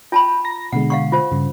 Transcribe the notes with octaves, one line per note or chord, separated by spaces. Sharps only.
F4 G5 A5 B5
A#5 A#6
B2 D3 G#3 F#5
F5 F#5 C#6
F4 C5
G2 C#3